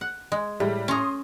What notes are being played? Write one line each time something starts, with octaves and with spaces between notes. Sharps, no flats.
F#5
G#3
A2 G3 G#3
C#4 A#5 C6 D#6